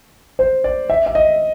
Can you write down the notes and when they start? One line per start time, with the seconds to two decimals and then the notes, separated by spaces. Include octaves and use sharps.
0.39 C5
0.64 D5
0.90 E5
1.06 E5
1.15 D#5